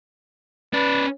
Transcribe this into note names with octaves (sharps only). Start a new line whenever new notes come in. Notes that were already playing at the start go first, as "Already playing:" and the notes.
C#4 B4 D5